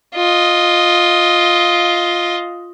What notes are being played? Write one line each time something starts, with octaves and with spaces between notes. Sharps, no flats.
F4 D#5